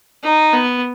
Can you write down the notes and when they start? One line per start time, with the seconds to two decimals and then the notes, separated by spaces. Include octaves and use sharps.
0.23 D#4
0.53 B3